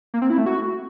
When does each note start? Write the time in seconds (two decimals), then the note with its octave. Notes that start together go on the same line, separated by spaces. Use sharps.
0.14 A#3
0.22 C4
0.30 E4
0.38 A3
0.46 F#4